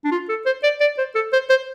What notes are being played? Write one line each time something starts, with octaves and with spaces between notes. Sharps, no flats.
D4
F4
A4
C5
D5
D5
C5
A4
C5
C5